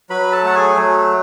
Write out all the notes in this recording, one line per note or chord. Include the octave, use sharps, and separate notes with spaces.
F#3 B4 B5
A4 A5
A3 F#5
G#4 G#5
F#3